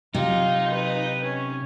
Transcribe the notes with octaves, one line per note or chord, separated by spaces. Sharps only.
C3 F#3 D#4 F4
B4
C#4